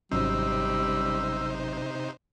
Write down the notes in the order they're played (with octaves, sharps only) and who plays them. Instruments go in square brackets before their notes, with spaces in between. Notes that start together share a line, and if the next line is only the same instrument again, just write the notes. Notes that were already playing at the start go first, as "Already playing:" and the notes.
[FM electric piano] G#1 F#3 C#4 [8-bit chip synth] C3 D#4 C5 [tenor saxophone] G3 [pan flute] E6